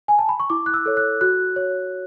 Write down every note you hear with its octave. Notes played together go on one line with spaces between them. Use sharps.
G#5
A5
B5
C#6
E4 D6
F#6
E6
A4 C#5
F#6
F#4 F#6
C#5